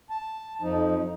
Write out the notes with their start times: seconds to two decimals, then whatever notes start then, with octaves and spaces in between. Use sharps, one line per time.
0.10 A5
0.62 F2 F3 D#4